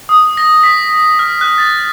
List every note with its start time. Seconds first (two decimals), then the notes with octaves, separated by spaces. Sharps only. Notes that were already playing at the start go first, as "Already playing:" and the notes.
0.09 D#6
0.37 A#6
0.63 B6
1.19 F6
1.41 F#6
1.58 A6